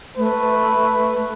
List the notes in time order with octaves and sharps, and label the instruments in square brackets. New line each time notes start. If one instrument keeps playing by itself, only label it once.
[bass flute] A3 [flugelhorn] B4